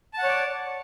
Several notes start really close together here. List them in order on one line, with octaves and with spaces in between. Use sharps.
A5 F#5 C#5 D5